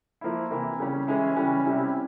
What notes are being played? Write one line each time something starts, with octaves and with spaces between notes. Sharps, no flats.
F3 A#3 E4
C3 E3 A#3 E4
C#3 G3 C#4
E3 G#3 C#4 E4
C#3 E3 G3 C#4 E4
C3 G3 C#4 E4